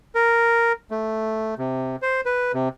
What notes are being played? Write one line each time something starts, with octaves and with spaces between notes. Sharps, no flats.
A#4
A3
C3
C5
B4
C3